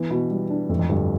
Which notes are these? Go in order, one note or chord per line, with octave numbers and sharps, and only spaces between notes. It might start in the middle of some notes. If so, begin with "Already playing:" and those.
Already playing: E3 B3
B2
G3
D4
F2 A3
F2
D2 G2